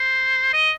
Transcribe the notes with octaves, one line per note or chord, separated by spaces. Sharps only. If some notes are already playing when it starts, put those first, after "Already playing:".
Already playing: C5
D#5